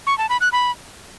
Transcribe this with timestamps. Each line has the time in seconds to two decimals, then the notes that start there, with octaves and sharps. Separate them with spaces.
0.07 C#6
0.18 A5
0.29 B5
0.41 F#6
0.52 B5